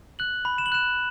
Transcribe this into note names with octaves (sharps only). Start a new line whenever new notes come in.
F#6 F#7
B5
E7
F#7
F#6 E7